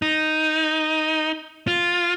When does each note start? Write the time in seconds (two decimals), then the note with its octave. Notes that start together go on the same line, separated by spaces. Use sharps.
0.02 D#4
1.68 F4